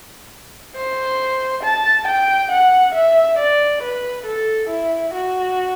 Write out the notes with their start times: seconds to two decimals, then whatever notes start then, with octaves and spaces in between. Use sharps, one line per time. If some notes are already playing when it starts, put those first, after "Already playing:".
0.76 C5
1.63 A5
2.07 G5
2.52 F#5
2.95 E5
3.39 D5
3.83 B4
4.26 A4
4.70 E4
5.14 F#4